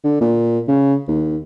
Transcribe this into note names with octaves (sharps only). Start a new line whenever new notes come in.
D3
A#2
C#3
D#2